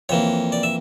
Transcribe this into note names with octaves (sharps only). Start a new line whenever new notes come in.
F2 E3 A#3 C#5
D5
E5